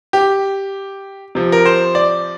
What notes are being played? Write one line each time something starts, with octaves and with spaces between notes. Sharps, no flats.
G4
C3 F3
A#4
C5
D5